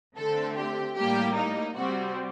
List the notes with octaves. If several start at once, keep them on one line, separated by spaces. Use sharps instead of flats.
D3 A3 C4 A4
G4
A2 G3 A#3 G4
D#4
C3 G3 C4 F#4